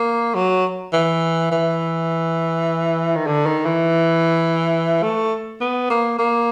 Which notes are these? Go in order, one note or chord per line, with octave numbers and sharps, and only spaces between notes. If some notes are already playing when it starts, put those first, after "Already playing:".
Already playing: A#3
F#3
E3
E3
D#3
D3
D#3
E3
A3
B3
A#3
A#3